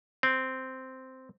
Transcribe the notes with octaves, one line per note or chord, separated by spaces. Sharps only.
C4